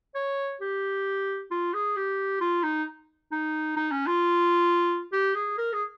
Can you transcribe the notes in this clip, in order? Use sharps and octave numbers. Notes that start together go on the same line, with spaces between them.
C#5
G4
F4
G#4
G4
F4
D#4
D#4
D#4
C#4
F4
G4
G#4
A#4
G#4